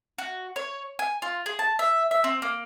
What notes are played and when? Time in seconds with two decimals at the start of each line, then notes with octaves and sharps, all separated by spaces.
0.18 F#4
0.56 C#5
0.99 G#5
1.22 F4
1.46 G#4
1.59 A5
1.79 E5
2.11 E5
2.24 C4
2.42 A#3